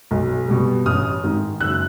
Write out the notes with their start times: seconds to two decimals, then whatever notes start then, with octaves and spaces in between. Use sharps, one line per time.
0.11 B1
0.48 B2 G3
0.86 A1 D#6 F6
1.23 G#2 D#3
1.60 F#1 E6 F#6